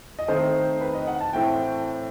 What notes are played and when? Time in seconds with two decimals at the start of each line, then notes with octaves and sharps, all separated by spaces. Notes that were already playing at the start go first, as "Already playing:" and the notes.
0.19 D#5
0.28 D#3 A3 C4 C5
0.81 B4
0.94 D#5
1.07 F#5
1.21 A5
1.33 A2 E3 A3 C4 G5